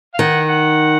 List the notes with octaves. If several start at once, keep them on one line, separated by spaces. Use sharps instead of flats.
F5
D#3 F#5
F#5